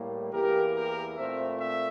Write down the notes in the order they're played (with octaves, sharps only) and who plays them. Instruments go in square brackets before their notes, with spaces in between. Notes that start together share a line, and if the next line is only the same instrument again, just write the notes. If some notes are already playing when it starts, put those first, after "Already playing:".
Already playing: [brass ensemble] A2 G3 A#3
E2 E3 A#3 G4 A#4
G4 A#4
A#2 A3 C4 C5 E5
E5